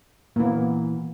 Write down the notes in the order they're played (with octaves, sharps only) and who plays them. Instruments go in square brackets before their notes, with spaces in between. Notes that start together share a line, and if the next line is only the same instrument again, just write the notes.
[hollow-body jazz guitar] A#2 E3 [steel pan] A#3 B3